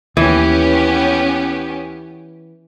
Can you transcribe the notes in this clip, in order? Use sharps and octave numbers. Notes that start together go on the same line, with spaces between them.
D#2 E3 B3 C#4 G4